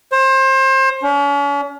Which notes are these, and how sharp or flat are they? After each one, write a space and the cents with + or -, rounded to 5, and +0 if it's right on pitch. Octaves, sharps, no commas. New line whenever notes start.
C5 +30
C#4 +40